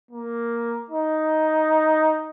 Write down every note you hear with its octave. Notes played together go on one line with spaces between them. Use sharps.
A#3
D#4